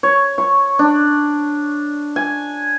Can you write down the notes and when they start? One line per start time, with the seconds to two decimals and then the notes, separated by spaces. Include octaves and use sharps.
0.03 C#5
0.38 C#6
0.79 D4
2.16 G#5